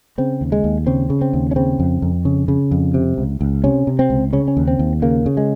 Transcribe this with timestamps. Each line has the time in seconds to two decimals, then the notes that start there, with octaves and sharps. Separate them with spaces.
0.18 C#3 C4
0.41 D#2
0.52 G#3
0.64 D#2
0.87 C#3 C4
1.10 C#3
1.21 C4
1.33 D#2
1.51 C#4
1.56 C#3 C4
1.79 F2
2.02 F2
2.25 C#3
2.48 C#3
2.71 F2
2.94 C3
3.18 C#2
3.41 C#2
3.64 C3 C#4
3.87 C3
3.99 C4
4.10 C#2
4.33 C#3 C#4
4.48 C#4
4.57 D#2
4.68 C4
4.79 D#2
5.02 C#3 A#3
5.26 C#3
5.37 G#3